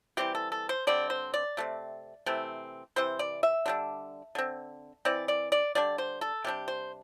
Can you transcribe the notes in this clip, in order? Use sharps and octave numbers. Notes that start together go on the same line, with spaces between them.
E3 G3 C4 G4
A4
A4
C5
D3 G3 C4 D5
C5
D5
C3 A3 C4
C3 E3 A3 C4
C3 E3 C4 C5
D5
E5
D3 G3 D4
D3 C4
E3 C4 D5
D5
D5
D3 G3 D4 D5
C5
A4
C3 G3 D4 G4
C5